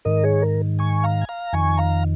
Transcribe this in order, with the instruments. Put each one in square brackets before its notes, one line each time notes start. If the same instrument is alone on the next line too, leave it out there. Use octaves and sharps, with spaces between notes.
[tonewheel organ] G#2 D#3 A#4 D#5
G#4 C#5
A#4
G#5 C#6
F5 A#5
G#5
F5 A#5
F2 D#3 G#5 C#6
F5 A#5